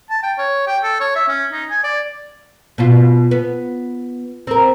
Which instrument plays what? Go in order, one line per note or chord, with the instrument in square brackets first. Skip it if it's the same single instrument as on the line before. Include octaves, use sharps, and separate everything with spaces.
[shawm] A5
G5
C#5
G5
A4
C#5
E5
C#4
D#4
G#5
D5
[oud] B2 F4
B3
C4 A#4